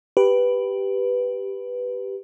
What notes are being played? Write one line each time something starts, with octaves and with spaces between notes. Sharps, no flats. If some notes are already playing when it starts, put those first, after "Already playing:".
G4 B4